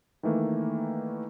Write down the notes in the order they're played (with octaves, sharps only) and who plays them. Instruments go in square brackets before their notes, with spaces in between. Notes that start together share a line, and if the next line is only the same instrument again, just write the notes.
[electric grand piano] D#3 E3 A3 A#3